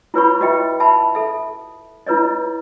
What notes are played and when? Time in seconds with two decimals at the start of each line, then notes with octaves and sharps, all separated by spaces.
0.14 E4 F4 B4 C#5 B5 C#6
0.40 F4 F#4 B4 D#5 E5 G5
0.80 E5 A5 B5
1.15 A4 E5
2.07 E4 F4 B4 C#5 D#5